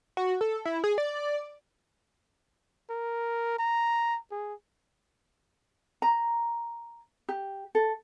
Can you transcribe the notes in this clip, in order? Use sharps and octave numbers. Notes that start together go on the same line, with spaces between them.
F#4
A4
E4
G#4
D5
A#4
A#5
G#4
A#5
G4
A4